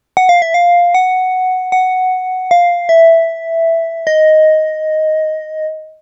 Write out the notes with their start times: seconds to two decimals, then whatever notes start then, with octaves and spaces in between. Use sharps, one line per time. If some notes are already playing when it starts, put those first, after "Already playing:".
0.17 F#5
0.29 F5
0.42 E5
0.54 F5
0.94 F#5
1.72 F#5
2.51 F5
2.89 E5
4.07 D#5